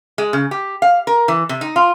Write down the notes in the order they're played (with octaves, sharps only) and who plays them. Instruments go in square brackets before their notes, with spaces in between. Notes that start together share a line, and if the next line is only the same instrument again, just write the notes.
[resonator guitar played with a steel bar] G#3
C#3
G4
F5
A#4
E3
C3
D#4
F4